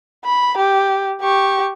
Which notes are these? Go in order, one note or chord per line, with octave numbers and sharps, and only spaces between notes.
B5
G4
G4 C#6